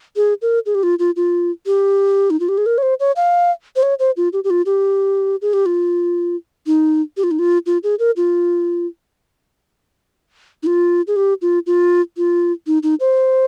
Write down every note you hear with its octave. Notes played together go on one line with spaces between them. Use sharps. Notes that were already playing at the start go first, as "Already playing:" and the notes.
G#4
A#4
G#4
G4
F4
F4
F4
G4
D#4
F4
G4
G#4
A#4
C#5
C5
C#5
F5
C5
C#5
C5
F4
G4
G4
F4
G4
G#4
G4
F4
D#4
G4
F4
D#4
F4
F4
G#4
A#4
F4
D#4
F4
G#4
G4
F4
F4
F4
D#4
D#4
C5